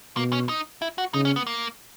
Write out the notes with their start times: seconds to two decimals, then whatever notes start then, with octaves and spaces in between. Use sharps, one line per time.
0.16 B2 A#3
0.33 C#4
0.49 D#4
0.82 E4
0.98 F#4
1.14 C#3 D#4
1.25 C#4
1.36 B3
1.47 A#3